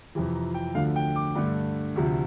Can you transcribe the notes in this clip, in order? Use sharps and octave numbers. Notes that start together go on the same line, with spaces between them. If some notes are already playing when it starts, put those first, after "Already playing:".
F2 C3 E3
A#5
G5
D2 D3 F3 A3 F5
G5
D6
G2 D3 A3
D2 C3 F3